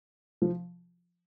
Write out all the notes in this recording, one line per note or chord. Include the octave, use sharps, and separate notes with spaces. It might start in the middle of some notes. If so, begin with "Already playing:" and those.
F3